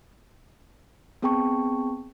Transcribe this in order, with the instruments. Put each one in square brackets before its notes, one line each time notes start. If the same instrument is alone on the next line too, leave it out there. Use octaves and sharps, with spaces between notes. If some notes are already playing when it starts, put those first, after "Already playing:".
[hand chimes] B3 C4 G#4 G5 A5 C#6